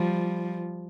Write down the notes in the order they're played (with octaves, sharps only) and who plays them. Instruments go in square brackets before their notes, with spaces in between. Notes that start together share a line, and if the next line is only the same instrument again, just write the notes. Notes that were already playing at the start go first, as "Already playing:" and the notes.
Already playing: [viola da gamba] F3 G3